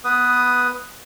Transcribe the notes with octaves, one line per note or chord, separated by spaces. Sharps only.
B3 B4 D#6